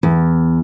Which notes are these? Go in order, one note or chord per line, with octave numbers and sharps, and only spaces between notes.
E2